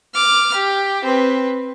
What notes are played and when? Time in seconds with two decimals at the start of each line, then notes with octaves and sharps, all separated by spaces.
0.14 D6 F6
0.54 G4
1.04 C4 B4